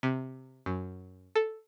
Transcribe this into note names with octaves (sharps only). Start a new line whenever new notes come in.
C3
F#2
A4